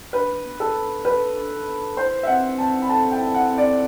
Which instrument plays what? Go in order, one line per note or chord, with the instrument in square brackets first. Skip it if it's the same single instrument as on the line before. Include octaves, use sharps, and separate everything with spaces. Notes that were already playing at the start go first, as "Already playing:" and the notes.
[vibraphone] D4 [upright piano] B4
[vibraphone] B3
[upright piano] A4
[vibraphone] B3
[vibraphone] A4 [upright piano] B4
[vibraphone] D4
B3
[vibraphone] E4 [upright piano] C5
[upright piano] E5
[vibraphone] C4 [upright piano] F#5
[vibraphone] C4 [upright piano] A5
[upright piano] B5
[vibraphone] A4 [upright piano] A5
[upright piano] G5
[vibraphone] E4
[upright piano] F#5
[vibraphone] C4
[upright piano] D5